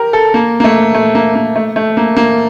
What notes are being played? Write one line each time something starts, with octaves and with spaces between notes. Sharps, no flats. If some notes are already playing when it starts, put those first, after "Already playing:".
Already playing: G4 A#4
A4
A#3
A#3
A3
A3
A#3
A#3
A3
A3
A#3
A#3